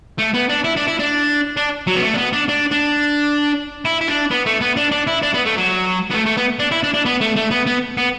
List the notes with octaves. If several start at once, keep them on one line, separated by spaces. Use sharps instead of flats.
A3
B3
D4
E4
D4
E4
D4
D4
F#3
B3
A3
D4
B3
D4
D4
D4
E4
E4
D4
B3
A3
B3
D4
D4
E4
D4
B3
A3
F#3
B3
A3
A3
B3
D4
E4
D4
D4
B3
A3
A3
B3
B3
B3